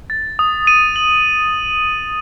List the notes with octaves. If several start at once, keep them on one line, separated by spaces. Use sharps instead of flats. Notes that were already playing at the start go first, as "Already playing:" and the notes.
A6
D#6
D#7
F#7